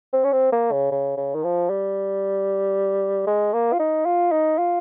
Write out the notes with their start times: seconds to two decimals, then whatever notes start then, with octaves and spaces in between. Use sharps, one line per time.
0.13 C4
0.24 C#4
0.32 C4
0.52 A#3
0.72 C#3
0.91 C#3
1.17 C#3
1.35 D#3
1.44 F3
1.70 G3
3.27 G#3
3.53 A#3
3.73 F4
3.80 D#4
4.06 F4
4.32 D#4
4.58 F4